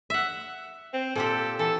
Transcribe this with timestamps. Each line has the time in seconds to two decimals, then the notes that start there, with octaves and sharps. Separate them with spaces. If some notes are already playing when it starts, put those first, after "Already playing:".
0.10 E5 F#5
0.93 C4
1.15 A#2 C4 G4 A4
1.59 E3 A4